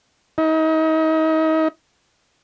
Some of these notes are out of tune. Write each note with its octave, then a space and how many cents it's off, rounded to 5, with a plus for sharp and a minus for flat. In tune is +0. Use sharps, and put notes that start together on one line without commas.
D#4 +35